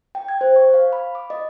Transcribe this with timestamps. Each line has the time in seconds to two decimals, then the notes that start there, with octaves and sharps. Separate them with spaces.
0.15 G5
0.28 G#6
0.41 C5
0.56 C#6
0.74 F5
0.93 B5
1.15 D6
1.30 D#5